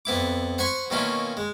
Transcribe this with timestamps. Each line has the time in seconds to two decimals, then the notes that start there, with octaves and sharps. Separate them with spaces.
0.05 F2 B3 E4 D6
0.58 C5 F#5 G#5 B5 C#6
0.90 B2 D#3 A#3 C#4 E4 F4
1.37 G#3